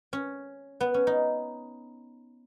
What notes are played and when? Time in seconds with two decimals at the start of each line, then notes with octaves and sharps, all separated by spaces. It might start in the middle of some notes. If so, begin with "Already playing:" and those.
0.13 C#4
0.81 B3
0.94 C#4
1.07 D#4